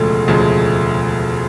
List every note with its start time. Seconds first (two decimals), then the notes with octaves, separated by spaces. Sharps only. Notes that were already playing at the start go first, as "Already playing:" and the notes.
Already playing: E1 D2 C#3 F3 G#3 A3
0.28 E1 D2 C#3 F3 G#3